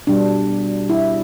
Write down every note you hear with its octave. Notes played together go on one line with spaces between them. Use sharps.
B2 G3 D4
E4